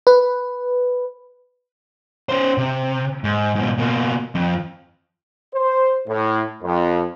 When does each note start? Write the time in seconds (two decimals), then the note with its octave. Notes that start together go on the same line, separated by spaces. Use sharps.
0.07 B4
2.29 C#4 C5
2.58 C3
3.24 G#2
3.55 G#2 B2
3.78 B2 A#3
4.35 F2
5.53 C5
6.08 A2
6.63 F2